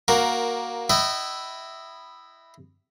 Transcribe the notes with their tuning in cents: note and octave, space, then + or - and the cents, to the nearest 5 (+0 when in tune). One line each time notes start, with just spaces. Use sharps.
A#3 +10 F#4 +0 A#4 +0
E4 +0 D#5 -15 G5 -45